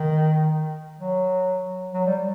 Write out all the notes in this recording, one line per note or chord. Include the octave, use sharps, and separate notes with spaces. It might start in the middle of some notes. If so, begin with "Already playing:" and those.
Already playing: D#3
F#3
F#3
G3